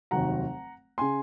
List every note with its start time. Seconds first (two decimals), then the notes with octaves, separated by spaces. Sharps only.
0.11 F1 D#2 D#3 F#3 F#5 A#5
0.98 C#3 G#5 C6